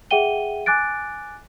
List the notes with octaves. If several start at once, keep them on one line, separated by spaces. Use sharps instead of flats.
G#4 E5 F#5 G5 D#7 G7
G#5 D6 F#6 A6 D7